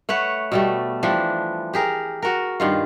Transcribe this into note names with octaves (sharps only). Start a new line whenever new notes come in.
A3 B4 C#5 F#5
B2 G3 A3
E3 F3 G3 D4
G4 G#4 A#4
F#4 A#4
G2 D#3 F4